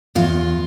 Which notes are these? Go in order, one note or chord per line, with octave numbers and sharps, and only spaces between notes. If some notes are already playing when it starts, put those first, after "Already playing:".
E2 F4